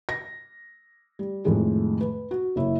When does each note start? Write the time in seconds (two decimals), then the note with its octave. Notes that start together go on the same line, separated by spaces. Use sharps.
0.09 A#6
1.19 G3
1.44 F2 A2 D#3 G#3 A3
2.01 B4
2.31 F#4
2.56 F#1 E4 C#5